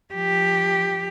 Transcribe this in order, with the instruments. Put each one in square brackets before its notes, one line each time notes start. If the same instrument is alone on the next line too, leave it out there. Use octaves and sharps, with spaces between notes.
[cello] F3 G4